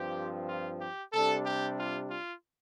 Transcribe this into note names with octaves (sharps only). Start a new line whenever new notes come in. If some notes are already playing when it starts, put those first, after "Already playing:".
Already playing: G2 F3 C4 G4
F4
G4
C3 G3 D4 A4
G4
F4
F4